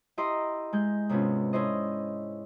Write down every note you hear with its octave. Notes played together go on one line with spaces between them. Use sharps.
E4 G4 D#5 A#5 C6
G#3 G6
G#2 C3 B3 C#4 F4
C#4 D4 E4 C5 D#5